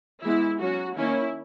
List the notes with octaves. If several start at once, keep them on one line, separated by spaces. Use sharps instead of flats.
E3 G#3 B3 E4
F#3 C#4 F#4
D#3 A#3 C#4 E4